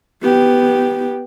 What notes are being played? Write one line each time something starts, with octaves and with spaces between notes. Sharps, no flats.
B3 G4